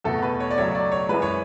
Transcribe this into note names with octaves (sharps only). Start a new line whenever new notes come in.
E2 B2 A3 A4
B4
C#5
D5
C#2 C#3 F#3 A3 C#5
D5
C#5
F#2 E3 G#3 B4
C#5